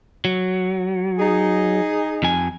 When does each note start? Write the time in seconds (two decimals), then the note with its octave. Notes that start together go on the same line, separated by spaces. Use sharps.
0.25 F#3
1.18 D#4 G#4
2.23 F2 G#5